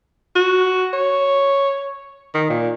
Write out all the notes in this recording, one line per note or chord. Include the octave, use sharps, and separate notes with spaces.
F#4
C#5
D#3
A#2